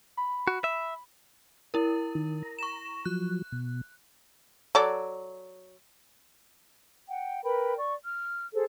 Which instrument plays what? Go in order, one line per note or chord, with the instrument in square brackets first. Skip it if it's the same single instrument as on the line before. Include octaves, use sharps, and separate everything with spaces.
[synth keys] B5
[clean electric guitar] F#4
E5
[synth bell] E4 A#4
[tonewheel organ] D#3
A#5
[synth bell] C#6 E7
[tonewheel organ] F3 F#3 [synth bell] F#6
[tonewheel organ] B2
[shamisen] F#3 A4 D5
[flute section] F#5 G5
A#4 B4 G5 B5
D5 C#6
F6
G#4 A4 C5